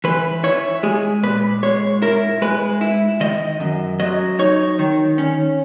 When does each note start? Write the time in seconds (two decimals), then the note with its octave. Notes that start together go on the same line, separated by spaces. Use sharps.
0.04 E3 B4
0.44 E4 C#5
0.83 G#3 G#4
1.23 A#2 B4
1.63 G#3 C#5
2.02 E4 A#4
2.42 G#3 B4
2.81 E4
3.20 D#3 D#5
3.60 F#2
4.00 F#3 D#5
4.39 D#4 C#5
4.79 D#3
5.18 C#4